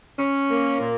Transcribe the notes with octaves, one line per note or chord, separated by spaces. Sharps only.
C#4
A#3
A#2